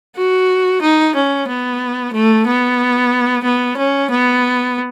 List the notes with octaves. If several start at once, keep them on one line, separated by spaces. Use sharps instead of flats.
F#4
D#4
C#4
B3
A3
B3
B3
C#4
B3